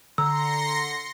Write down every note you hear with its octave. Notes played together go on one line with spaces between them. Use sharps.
D3 A#5 C6 E6 A#6 C#7